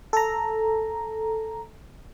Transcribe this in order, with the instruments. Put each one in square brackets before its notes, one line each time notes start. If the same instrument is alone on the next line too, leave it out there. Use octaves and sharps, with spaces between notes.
[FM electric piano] A4 A#5